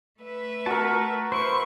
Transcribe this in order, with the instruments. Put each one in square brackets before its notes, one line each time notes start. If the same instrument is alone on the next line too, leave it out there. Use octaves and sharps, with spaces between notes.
[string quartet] A3 B4 E5
[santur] F#4 A#4 [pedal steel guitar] A5 C#6
[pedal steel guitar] E4 C5 [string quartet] B4 C#6